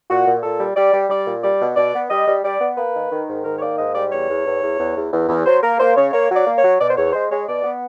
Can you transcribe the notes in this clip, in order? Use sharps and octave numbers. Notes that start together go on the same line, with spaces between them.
A#2 F#4
A#2
A#2 A4
G3
G3 D5
G3
G3 D5
A#2
G3 D5
B2
B2 D5
B3
G3 D#5
G3
G3 D5
B3
A#3 B4
D#3
D#3
G#2
D#3 A#4
C#5
A#3 D5
G#2 D#5
G3 D5
E2 C#5
E2
E2
E2
E2
E2
E2
E2
F#3 C5
A#3 A#4
A#3 C5
C#3 C#5
A#3 C#5
F#3
D5
A#3
C#5
F#3
B2 D5
C5
E2 C#5
G#3 C5
G#3 C#5
B2 D5
B3